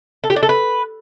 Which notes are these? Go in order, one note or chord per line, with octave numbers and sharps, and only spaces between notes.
A4
G4
D4
A4
B4